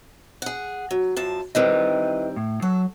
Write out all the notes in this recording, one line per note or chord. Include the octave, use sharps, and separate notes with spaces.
G#4 F#5
F#3
F#2 F3 A5
D#3 G3 C4 E4 B4 D#5
A2
F#3 A4